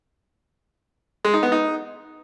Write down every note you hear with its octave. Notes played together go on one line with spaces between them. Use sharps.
G#3
D#4
B3
D#4